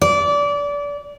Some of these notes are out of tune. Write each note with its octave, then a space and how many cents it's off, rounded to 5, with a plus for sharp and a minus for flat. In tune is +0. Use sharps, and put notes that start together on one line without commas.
D5 -25